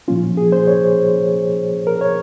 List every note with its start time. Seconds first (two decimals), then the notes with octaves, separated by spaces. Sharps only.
0.08 A#2 F3 A#3 C#4 F4
0.37 G#4
0.52 C5
0.67 C#5
1.87 A#4
2.01 C#5